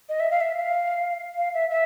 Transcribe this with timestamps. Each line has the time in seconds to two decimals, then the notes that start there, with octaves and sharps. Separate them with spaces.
0.09 D#5
0.20 E5
0.31 F5
0.41 E5
0.57 F5
1.38 F5
1.54 E5
1.70 E5